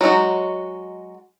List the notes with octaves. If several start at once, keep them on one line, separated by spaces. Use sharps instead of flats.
F#3 G#3 D#4 F#4